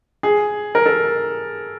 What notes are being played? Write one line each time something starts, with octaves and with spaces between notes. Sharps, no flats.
G#4
A#4
A4